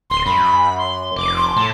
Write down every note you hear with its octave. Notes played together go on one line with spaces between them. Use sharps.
D1 C6
F#2 B5
C6
F1 D6
C6
A2 A5